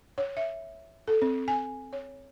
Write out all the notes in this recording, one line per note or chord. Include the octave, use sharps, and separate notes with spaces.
C#5
E5
A4
C4
G#5
C#5